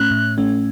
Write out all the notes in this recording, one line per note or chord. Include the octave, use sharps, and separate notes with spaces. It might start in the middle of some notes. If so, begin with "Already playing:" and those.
Already playing: A2 A3 C#4 F#6
A2
A3 C#4